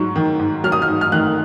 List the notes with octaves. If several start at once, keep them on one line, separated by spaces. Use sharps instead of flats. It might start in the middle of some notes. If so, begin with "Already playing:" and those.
Already playing: G#2 F#3 C#6
D#3
G#2
F#3 F6
D#6
F6
G#2
F6
D#3 F#6